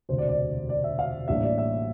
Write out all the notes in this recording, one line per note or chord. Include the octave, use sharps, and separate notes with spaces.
E1 D2 C3 C5
D5
D5
D5
E5
F5
A1 A2 G3 A#3 D4 E5
D5
E5